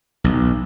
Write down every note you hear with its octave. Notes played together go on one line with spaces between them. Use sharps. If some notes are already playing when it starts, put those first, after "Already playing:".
B1